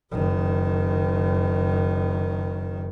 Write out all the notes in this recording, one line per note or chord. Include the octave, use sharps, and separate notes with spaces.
F#1 D#3